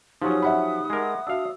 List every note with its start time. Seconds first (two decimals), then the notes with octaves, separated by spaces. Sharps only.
0.22 F3 F#3 C#4 D#4 G4 D#6
0.42 E5 F#5 B5
0.90 G#3 A#4
1.27 D4 F#4 E5 F5 E6